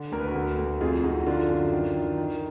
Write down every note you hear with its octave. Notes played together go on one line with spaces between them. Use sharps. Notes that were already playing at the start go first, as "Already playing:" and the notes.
Already playing: D3
D2 A#4
B4
F#4 A#4
D2
D2
F2 F4 G#4
F2 D#4 F#4
F#4
D3 D4 F4
F#2
D#3
D#3
D#3